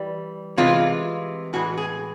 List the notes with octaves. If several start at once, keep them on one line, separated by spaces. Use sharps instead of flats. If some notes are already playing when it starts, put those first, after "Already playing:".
Already playing: E3 G3
C3 E3 G#3 F4
A2 E3 G#3 F#4
G#4